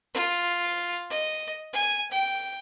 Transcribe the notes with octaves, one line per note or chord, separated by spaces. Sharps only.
F4
D#5
G#5
G5